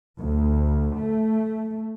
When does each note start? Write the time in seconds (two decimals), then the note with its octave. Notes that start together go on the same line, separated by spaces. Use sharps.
0.19 D2
0.99 A3